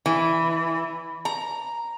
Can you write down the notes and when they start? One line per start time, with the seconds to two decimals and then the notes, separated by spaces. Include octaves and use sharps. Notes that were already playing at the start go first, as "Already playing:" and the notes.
0.06 E3
1.25 A#5